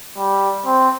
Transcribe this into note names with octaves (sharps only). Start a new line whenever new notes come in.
G3
C4